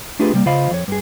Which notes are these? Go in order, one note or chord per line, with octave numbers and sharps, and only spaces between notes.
A3 D4 F4 G4 G#4 B4
C3 G3 A#3
C#3 F4 C5 D#5 F5 B5
F2 C#5
G2 G#4